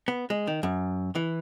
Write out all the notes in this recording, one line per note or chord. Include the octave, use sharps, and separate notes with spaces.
B3
G#3
D#3
F#2
E3